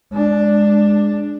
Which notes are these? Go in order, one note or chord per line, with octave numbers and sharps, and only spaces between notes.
G#3 D4